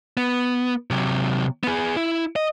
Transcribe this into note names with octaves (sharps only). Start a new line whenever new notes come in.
B3
C3 F#3
B3 G#4
E4
D#5